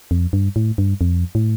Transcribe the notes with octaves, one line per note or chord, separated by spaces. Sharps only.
F2
G2
A2
G2
F2
A2